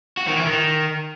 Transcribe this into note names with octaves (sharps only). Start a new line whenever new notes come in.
F#4
D#3
E3
D#3